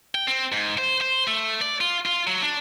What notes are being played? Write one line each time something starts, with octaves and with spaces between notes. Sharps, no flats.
G5
C4
G#2
C5
C5
A3
D5
F4
F4
F#3
D4